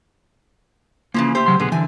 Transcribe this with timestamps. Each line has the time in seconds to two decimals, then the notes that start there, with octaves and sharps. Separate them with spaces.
1.14 C#3 E3 F3 A#3
1.35 A3 G4 C5
1.46 C#3 F#3 C6
1.60 B1 D3 B3 G#4
1.72 D3 E3 G#5